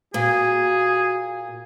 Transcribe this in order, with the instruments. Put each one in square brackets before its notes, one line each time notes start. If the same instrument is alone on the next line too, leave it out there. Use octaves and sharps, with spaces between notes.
[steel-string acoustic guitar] A#2 [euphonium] F#4 [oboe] G#4